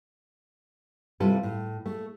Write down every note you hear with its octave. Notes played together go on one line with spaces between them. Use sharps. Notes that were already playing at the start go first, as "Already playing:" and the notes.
C3 G3 E4 F4 A4 B4
A2
A3